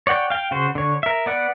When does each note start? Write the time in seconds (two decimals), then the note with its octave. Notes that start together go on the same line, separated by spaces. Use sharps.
0.07 C#5 D5 F#5 G5
0.30 F5 G5
0.51 C#3 F#4 C5
0.75 D3 C#5
1.03 A#4 E5
1.26 B3 D5 F#5